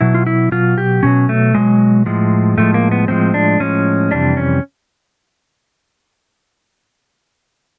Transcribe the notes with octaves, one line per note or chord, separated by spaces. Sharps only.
B2 F#3 E4
F4
E4
B2 F#3 F4
G4
B2 F#3 C#4
A3
B2 F#3 G#3
A2 F3 G#3
A2 F3 G#3 A3
A#3
B3
A2 F3 G#3 C4
D4
A2 F3 G#3 C#4
F2 C3 E3 G3 D4
C#4